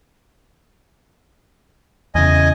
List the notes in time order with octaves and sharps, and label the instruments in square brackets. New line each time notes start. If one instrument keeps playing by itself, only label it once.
[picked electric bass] E2 C#3 [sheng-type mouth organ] D#5 G#5